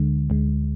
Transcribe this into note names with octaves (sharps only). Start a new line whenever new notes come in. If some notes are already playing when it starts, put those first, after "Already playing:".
Already playing: D2 D3 G#3
D2 D3 G#3